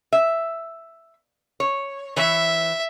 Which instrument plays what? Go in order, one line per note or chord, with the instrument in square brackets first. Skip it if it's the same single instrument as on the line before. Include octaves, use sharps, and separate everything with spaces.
[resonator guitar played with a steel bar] E5
C#5
[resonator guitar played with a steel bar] E3 C#5 [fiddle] E5